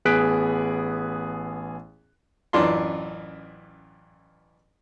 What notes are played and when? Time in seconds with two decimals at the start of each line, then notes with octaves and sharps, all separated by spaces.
0.05 A1 B3 G#4 F#6 B6 D7
2.53 A1 F#2 E3 D4 F4 C6